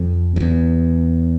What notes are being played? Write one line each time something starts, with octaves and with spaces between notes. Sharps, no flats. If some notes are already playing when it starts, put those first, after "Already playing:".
Already playing: F2
F2
E2